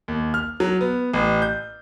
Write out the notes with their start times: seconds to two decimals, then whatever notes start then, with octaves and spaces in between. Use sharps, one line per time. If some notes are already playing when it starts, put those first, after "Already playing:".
0.08 D#2
0.34 F6
0.60 F#3
0.81 B3
1.14 A1
1.42 G6